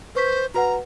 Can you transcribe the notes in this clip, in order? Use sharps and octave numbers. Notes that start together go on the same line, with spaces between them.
B4 C5 C#6 B6
F#4 B4 F#5 A#5